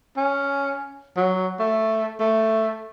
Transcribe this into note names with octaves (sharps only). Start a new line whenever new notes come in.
C#4
F#3
A3
A3